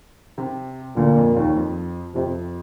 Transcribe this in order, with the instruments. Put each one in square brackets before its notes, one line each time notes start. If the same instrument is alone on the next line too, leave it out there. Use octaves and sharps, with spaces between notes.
[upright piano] C3
[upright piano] D2 D3 [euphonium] A#2
[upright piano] F2 F3
D#2 D#3
F2 F3
[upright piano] F2 F3 [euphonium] C3